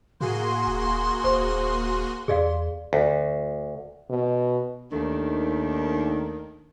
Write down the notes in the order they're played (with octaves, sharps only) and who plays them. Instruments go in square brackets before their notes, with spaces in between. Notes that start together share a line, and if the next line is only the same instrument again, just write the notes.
[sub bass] A2 [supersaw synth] A#3 F#4 G#4 [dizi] C6
[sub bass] D#1
[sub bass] D#1 [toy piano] C5
[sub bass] E2 [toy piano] G#4 D5 F5
[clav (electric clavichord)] D2
[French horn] B2
[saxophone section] D#2 D#3 A3 D4